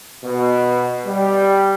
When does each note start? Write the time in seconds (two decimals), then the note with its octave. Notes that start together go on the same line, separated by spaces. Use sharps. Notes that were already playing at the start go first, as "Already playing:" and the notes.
0.24 B2
1.05 G3